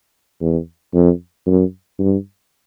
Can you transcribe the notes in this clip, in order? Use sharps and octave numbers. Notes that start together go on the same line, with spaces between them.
E2
F2
F#2
G2